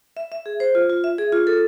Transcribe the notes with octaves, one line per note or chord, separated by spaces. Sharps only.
E5
E5
G#4
C5
F4
F4
E5
G#4
F4
A4